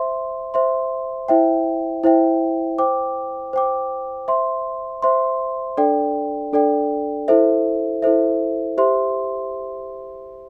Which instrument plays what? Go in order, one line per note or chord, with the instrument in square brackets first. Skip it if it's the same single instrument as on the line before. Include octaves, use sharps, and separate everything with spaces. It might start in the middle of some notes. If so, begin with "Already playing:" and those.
Already playing: [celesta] C5 E5 C6
C5 E5 C6
E4 C5 E5 G5
E4 C5 E5 G5
C5 G5 D6
C5 G5 D6
C5 E5 C6
C5 E5 C6
D4 A4 D5 G5
D4 A4 D5 G5
E4 A4 C5 E5
E4 A4 C5 E5
G4 C5 E5 C6